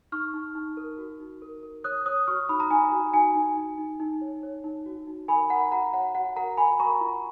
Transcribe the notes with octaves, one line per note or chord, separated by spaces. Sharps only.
D#4 C#6 F6
D#4
D#4
A#4
F#4
D#4
A#4
A#4
C#5 D#6 F#6
C#5 D#6 F#6
F#4 C#6 F6
D#4 B5 D#6
A#5
D#4 G#5
F#4
D#4 G#5
D#4
D#4
D#4
D#4
C#5
C#5
D#4
F#4
D#4
A#4 G#5 B5
A#4 F#5 A#5
F#4 F#5 A#5
C#5 F#5
F#4 F#5
A#4 F#5 A#5
F#4 G#5 B5
A#4 A#5 C#6
F4